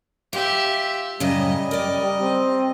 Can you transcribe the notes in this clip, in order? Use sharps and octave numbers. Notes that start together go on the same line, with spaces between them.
F4 G4 E5
F#2 A2 C#3 G3 D#5
A#4 D5 D#5
C4